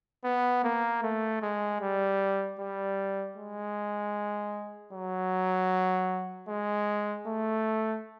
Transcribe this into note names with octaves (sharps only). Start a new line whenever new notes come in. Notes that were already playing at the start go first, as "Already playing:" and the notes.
B3
A#3
A3
G#3
G3
G3
G#3
F#3
G#3
A3